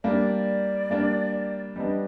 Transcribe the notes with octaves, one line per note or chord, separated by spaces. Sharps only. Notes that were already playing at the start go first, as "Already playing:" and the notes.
G3 A#3 D4 D5
G3 A#3 D4
G3 B3 D4 D#5